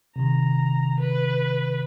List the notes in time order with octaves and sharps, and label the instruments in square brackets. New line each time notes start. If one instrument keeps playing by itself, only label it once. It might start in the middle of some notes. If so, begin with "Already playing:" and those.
[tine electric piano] C3 D#3 [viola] A#5
[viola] B4